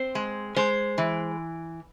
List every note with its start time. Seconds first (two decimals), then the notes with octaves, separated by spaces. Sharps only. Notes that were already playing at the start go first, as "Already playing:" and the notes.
Already playing: C4 C5
0.15 G#3
0.56 G#3 C5
0.98 E3